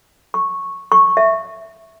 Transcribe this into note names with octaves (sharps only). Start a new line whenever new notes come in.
C#6
C#6
E5